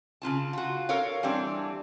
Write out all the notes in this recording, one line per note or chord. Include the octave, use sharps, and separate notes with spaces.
C#3 D4 F4 A5
F4 F#4
A4 A#4 C#5 F5
E3 G3 C4 D4